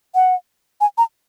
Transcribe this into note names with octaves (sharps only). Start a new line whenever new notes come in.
F#5
G#5
A#5